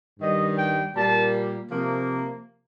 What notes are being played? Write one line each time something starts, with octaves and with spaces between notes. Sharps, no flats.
G2 D#3 G3 D#5
G5
A#2 G3 A#3 A5
C3 F3 A#3